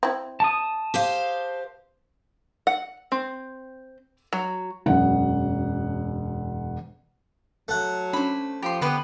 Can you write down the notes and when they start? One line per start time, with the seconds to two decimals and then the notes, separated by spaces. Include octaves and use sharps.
0.03 C4 E4
0.40 A5 D#6
0.94 G4 C5 F5
2.67 F#5
3.12 C4
4.33 F#3
4.86 E1 F#2 F#5
7.68 F#3 A3 F#5
8.13 C#4 D4 C5 B5
8.62 F3 G4 B5 C6
8.81 D3 B3 G4 B4 C5 D#6 D#7